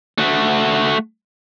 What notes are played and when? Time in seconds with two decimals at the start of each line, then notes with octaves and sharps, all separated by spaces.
0.18 A3 F#4